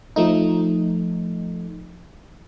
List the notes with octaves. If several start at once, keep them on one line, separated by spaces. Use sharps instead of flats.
F3 A3 D#4